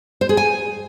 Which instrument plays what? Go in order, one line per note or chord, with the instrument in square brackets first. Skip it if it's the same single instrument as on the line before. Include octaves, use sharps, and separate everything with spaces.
[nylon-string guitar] C5
G#4
G#5